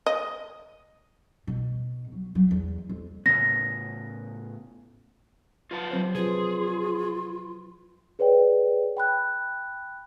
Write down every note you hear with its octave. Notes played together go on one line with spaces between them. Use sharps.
D#5
B2
F#3
F#3
E2
F2
A2 C#3 B3 A#6
F4 B4 A5
F#3 C4 C5
C3 F3 F4 G#4 B4
G#4 B4 C#5 D5 G5
G5 B5 F#6